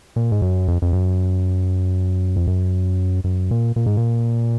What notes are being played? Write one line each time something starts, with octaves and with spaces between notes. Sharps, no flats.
A#2
G#2
F#2
F2
F2
F#2
F2
F#2
F#2
A#2
A#2
G#2
A#2